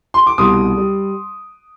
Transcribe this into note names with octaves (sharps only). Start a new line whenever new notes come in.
C6
D6
C2 B2 G3 C6 D#6
G3